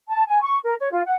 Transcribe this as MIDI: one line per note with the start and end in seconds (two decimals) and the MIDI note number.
0.08 0.23 81
0.28 0.42 80
0.42 0.57 85
0.64 0.74 70
0.78 0.91 73
0.91 1.01 65
1.05 1.15 78